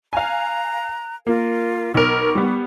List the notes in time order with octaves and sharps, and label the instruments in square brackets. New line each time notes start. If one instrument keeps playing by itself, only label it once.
[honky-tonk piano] F5 G#5 [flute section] A#5 F#6
[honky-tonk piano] A#3 [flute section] F4 A#4
[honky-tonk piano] B1 A#4 [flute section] B5 C#6 D6
[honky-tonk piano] G3 B3